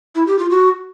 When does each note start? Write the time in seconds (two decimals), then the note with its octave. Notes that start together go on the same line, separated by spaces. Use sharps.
0.15 E4
0.27 G4
0.39 F4
0.50 F#4